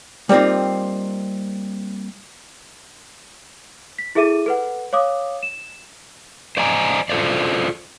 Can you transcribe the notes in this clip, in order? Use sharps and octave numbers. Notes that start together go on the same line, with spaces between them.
G3 A#3 C4 D#4 F4
B6
E4 G#4 A4 E5 D6 D#7
A4 B4 F#5
C#5 F5 D6 D#6
E7
C5 D5 D#5 G#5 A#5
F4 A4 C5 D5